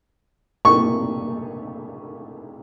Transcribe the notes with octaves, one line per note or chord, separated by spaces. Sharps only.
C#6